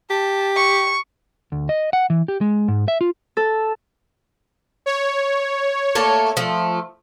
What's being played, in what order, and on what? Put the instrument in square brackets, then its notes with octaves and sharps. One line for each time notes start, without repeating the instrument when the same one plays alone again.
[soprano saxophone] G4 [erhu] A5
[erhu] C#6
[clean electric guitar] D2
D#5
F#5
E3
G4
G#3
G#2
E5
F4
[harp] A4
[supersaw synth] C#5
[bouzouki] A3 A#3 A5
F3 A3